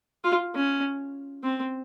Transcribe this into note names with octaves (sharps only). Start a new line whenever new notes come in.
F4
C#4
C4